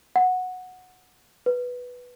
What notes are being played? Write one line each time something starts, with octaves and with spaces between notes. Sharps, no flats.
F#5
B4